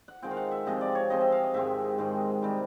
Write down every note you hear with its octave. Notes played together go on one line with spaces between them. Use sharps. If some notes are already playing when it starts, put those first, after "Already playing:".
F#5
D#3 G#3 C4 F4 G5
F5
F#5
E5
C3 F3 G#3 C4 D#5
D5
C#5
C3 F3 G#3 C4 D#5
E5
F5
D#5
G#2 D#3 G#3 C4 E5
G#2 D#3 G#3 C4
C3 D#3 G3